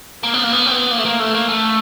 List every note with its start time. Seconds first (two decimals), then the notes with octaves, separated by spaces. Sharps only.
0.23 A#3
0.34 B3
0.43 A#3
0.53 B3
0.66 C4
0.72 B3
0.91 A#3
0.98 A3
1.06 A#3
1.20 A3
1.35 A#3
1.49 A3